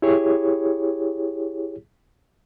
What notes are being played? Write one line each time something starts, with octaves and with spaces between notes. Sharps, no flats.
E4 G4 G#4 C#5